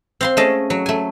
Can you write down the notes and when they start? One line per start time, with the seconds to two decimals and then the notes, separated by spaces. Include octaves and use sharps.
0.21 C4 F5 C6
0.37 A3 C#4 G#4 D#5 A5
0.70 F#3
0.86 A3 G#5